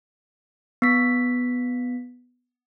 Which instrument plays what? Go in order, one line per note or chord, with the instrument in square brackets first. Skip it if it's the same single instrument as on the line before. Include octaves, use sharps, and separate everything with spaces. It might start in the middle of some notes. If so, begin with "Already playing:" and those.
[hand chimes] B3 B6